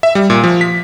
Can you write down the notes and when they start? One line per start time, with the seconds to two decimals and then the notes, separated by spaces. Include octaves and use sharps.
0.03 E5
0.15 G3
0.30 A#2
0.44 F3
0.61 B6